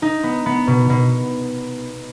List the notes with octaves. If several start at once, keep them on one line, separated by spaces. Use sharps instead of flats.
D#4
B3
B3
B2
B2